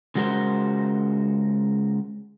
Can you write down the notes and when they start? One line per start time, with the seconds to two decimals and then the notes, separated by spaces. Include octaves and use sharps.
0.15 C#3 G#3 F#4 A#4 C5